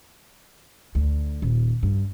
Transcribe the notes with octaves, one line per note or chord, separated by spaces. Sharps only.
D2
D#1
G2